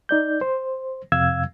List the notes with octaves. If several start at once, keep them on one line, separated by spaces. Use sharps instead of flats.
D#4 D5 G6
C5
F2 C3 F5 E6 G#6